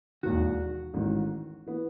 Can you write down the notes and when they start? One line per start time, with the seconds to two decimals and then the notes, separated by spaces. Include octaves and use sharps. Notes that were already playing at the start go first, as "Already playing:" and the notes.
0.23 E1 D#2 D#3 F#4
0.94 A1 G#2 D#3
1.66 E3 B3